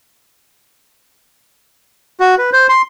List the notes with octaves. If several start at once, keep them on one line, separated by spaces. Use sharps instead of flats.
F#4
B4
C5
C6